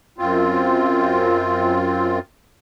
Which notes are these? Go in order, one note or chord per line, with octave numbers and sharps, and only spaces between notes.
F#2 C4 F4